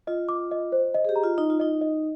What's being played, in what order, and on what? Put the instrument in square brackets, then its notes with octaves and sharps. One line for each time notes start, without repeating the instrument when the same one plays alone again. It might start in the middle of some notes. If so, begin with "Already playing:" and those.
[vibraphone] F4 [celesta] D#5
[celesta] D6
D#5
C5
D#5
[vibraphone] G#4
G4
[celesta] A#5
[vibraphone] F4
[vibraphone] D#4 [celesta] D#5
[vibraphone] F4
[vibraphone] D#4 [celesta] D#5
[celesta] D#5